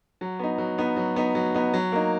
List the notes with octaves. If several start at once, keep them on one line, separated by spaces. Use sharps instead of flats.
F#3
B3 D#4
F#3
B3 D#4
F#3
B3 D#4
F#3
B3 D#4
F#3
A#3 D#4